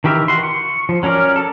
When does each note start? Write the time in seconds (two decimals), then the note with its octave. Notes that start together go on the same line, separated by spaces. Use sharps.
0.04 D#3 E3 G4 A#4 E5
0.28 F#4 C6
0.43 C#6
0.89 F3
1.03 F#3 C#4 A#4 D5
1.36 A4 A5